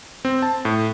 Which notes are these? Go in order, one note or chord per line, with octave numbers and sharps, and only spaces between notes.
C4
A5
A2